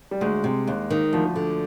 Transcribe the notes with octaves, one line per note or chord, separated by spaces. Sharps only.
G3
D2 G#3
C3
D#2
D#3
D2 F3
D3